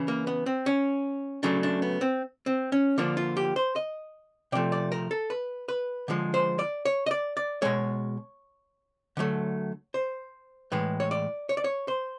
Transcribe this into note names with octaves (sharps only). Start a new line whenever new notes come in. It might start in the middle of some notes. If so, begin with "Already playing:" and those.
Already playing: C#3 E3
A#3
B3
C4
C#4
C#3 F#3 A3 D4
D4
B3
C4
C4
C#4
D3 F3 A#3 D4
F4
G4
C5
D#5
C3 F3 A3 D5
D5
A#4
A4
B4
B4
D3 F3 G#3
C5
D5
C#5
D#5
D5
D5
B2 G#3 C#5
D3 F#3 A3
C5
A2 E3 G#3 B4
C#5
D5
C#5
D5
C#5
C5